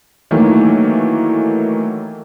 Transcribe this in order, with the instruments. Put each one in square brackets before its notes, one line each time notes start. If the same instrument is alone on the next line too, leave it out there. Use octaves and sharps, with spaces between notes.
[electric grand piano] D#3 E3 F#3 A3 A#3